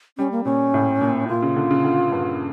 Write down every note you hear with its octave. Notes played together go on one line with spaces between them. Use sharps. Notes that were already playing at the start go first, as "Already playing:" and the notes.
G3 C#4
A#3
A#2 C#4
A2
A#2
A#2 F4
C#3
D3
C#3
D3
G2